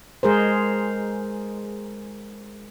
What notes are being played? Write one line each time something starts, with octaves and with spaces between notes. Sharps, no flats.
G#3 G#4 A#4 C5